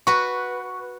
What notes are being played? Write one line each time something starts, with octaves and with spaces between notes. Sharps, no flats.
F#4 B4 C#6